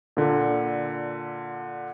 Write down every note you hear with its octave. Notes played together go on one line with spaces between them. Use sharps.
A#2 D3